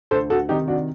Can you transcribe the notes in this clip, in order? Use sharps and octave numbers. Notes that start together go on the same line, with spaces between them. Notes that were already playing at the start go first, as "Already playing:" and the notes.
D2 A4 C5
F#4 A4
C3 D#3 D#4 G4
D4 F#4